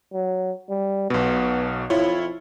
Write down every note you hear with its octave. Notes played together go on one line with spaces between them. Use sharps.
F#3
G3
B1 B2 B3
F2 E4 F4 C#5